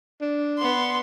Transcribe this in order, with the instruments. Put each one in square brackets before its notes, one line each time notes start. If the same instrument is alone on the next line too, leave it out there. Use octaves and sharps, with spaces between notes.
[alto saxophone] D4
[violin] B3 C6